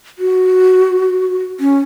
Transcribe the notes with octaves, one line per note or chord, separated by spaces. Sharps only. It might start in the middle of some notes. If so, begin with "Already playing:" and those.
F#4
C#4